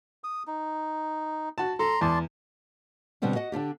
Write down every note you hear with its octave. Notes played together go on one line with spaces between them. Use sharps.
D#6
D#4
F#4 A5
A4 A#5 C6
E2 D5 A5 C6
B2 D3 G3 B3 C4 D4
F#4 D#5 F#5
D3 D4 F4 G4